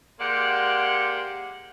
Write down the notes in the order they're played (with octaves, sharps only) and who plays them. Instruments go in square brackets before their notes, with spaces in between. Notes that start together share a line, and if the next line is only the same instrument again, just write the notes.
[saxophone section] G#3 A#3 G4 C5 D5 F#5